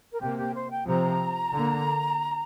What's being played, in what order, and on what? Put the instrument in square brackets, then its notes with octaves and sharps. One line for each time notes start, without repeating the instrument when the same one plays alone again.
[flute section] A#4
[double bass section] C3 A#3 [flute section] G4
[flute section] G4
C5
G5
[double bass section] C3 F3 C4 [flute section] A#5
[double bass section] D3 A#3